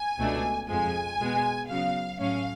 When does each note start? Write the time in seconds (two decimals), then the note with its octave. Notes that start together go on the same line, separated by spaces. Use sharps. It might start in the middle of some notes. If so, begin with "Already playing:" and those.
Already playing: G#5
0.18 C#2 B2 A3 D4
0.68 F2 F3 G#3 G#5
1.19 B2 G#3 B3
1.69 C#3 F#3 B3 F5
2.19 A2 F#3 C#4 F5